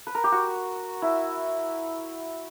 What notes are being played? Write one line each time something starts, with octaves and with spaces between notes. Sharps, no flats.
B4
A#4
G4
F#4
E4